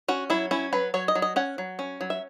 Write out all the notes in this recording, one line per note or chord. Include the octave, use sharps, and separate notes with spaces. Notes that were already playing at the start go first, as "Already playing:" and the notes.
C#4 F#4
F#3 E4
C#4 E4
F#3 B4
F#3 C#5
D#5
F#3
D#5
C#4 F#5
F#3
C#4
F#3
E5